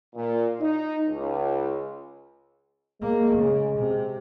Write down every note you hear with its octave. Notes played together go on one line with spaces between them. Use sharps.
A#2
D#4
C#2
G#3 A#3
C#3
C3